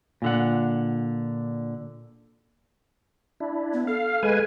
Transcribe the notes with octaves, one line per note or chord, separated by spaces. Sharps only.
A#2 D3 F#5
D4 E4
B3
A4 F5
G#3 B4 G#5